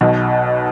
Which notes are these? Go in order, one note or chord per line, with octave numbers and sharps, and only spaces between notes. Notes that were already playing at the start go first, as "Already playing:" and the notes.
B1 B2